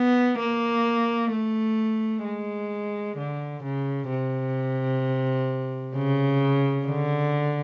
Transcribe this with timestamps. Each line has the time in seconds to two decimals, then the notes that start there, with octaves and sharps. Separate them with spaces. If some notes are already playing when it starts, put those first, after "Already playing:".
Already playing: B3
0.39 A#3
1.32 A3
2.24 G#3
3.17 D3
3.63 C#3
4.09 C3
5.95 C#3
6.87 D3